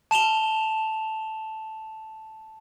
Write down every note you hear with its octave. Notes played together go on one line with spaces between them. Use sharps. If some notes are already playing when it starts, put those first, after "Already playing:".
A5 E7 F7 G7